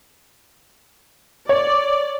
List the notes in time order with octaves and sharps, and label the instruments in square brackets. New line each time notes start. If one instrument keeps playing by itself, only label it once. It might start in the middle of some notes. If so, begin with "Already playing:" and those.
[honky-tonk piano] C#5 [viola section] D5